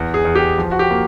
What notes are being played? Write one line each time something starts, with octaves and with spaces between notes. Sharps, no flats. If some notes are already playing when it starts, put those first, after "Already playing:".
Already playing: E2
G#4
E2
G4
F3
F#4
G4
A#3